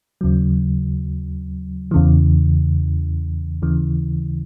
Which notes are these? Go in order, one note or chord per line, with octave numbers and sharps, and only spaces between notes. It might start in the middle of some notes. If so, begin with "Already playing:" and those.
D#2 C#3 F#3
E2 C#3 E3
D#2 C#3 E3